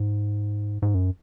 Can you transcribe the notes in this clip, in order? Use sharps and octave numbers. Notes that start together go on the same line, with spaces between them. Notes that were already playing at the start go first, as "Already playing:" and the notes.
Already playing: G#2
G#2
F#2